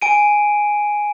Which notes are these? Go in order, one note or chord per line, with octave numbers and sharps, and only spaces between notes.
G#5 D7 D#7